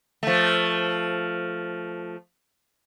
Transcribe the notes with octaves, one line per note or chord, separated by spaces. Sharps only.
F3 A3